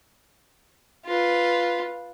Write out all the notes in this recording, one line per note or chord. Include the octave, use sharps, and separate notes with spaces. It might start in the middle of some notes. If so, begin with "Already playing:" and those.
F4 B4